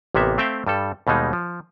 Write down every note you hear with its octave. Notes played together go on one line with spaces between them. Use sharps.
A1 C3 A#3 B3 E5
A3 C4 E5 F5 G5
G2 G3 A4
D#2 B2 G3 G#3 D#4
F3